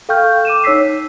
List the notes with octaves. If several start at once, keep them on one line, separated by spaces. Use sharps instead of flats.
A4 F5 G5 C#6 F6 G6
D6 D#7 E7
D#4 C#5 E6 B6 C7